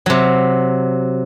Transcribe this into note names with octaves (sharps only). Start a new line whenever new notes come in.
C3 F#3